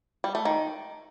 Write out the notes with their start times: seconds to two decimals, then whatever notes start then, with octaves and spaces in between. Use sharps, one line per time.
0.24 G3
0.35 A3
0.45 D#3